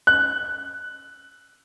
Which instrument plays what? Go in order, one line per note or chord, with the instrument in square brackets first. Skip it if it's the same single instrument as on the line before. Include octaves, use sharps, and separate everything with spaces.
[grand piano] F#6